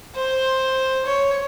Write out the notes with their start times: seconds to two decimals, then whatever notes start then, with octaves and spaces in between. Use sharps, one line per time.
0.15 C5
1.05 C#5